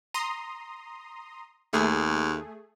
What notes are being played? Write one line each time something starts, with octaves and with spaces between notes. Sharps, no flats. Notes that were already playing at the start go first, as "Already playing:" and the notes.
A#5 C6 D#6
D#2 A3 G#4